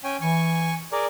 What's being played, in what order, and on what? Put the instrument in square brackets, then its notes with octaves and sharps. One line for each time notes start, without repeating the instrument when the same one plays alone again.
[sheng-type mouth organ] C#4 G5 G#5
[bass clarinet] E3 [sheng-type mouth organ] G#5 C#6
[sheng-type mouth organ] G#4 A#4 D5